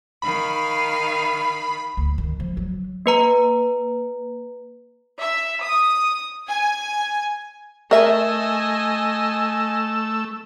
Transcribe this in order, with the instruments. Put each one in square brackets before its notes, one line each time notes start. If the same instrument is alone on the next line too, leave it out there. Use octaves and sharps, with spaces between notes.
[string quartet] D#3 F5 [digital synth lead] B5
[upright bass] D2
D#3
F3
F#3
[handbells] A#3 B4 A#5
[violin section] E5
D#6
G#5
[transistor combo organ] A3 E6 [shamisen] A#4 E5 [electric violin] D#5 G#5